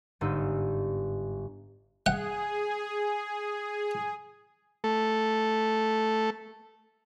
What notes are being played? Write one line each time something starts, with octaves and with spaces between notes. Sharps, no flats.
G1 G#2 D#4 E6
G#4 F#5
A3 A4